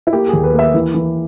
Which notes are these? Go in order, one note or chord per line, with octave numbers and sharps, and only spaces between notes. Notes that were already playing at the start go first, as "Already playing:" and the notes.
E4
A#3 G4
G#4
D#2
B4
A#3
E5
E3
E3